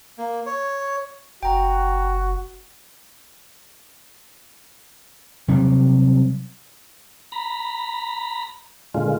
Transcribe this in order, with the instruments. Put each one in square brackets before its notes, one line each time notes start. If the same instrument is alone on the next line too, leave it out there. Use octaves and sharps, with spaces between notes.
[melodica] A#3
C#5
[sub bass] F#1 [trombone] F#4 [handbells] G5 A#5
[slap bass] C3 F#3 G3
[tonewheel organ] A#5 B5
A#2 D3 G#3 F4